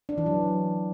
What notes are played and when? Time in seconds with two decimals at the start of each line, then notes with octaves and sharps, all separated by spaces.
0.09 D4
0.18 E3
0.26 F#3